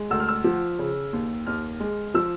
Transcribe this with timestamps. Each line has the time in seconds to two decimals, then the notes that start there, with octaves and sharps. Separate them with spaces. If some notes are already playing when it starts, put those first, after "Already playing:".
Already playing: G#3
0.10 D2 E6
0.20 F6
0.28 E6
0.44 F3
0.79 C#3
1.13 D#2
1.47 D#2 F6
1.80 G#3
2.14 F3 E6